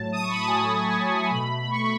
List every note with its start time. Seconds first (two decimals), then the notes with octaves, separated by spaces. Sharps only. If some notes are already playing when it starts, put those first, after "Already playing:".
Already playing: A2 F#3 A3 A5
0.12 D#6
0.21 C#6
0.30 B5
0.39 A5
0.47 A2 F#3 A3 G#5
0.88 A5
1.30 B2 A3 B5
1.71 C#6